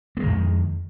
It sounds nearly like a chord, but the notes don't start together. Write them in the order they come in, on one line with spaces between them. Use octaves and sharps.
A#3 G#3 D#3 F2